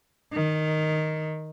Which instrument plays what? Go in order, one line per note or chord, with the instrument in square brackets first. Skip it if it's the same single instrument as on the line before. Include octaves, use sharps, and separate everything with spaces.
[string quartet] D#3